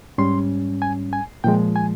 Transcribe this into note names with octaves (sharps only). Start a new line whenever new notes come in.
G#2 G3 C#4 C6
G#5
G#5
A#2 F3 G#3 G5
G#5